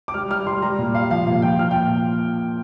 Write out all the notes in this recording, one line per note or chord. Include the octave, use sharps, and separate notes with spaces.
D6
G3 F6
G3 F6
G3 C6
G3 A#5
A#2
G3 F5
F3 F5
A#2 F5
F3 G5
F3 F6
G5
A#2